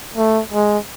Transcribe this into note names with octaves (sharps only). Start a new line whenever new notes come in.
A3
G#3